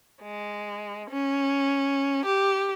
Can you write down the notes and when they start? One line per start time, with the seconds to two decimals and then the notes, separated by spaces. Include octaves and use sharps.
0.22 G#3
1.11 C#4
2.25 G4